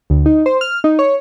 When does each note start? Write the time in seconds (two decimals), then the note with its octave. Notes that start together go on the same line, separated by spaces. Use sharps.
0.10 D2
0.26 D#4
0.46 C5
0.61 F6
0.84 D#4
0.99 C#5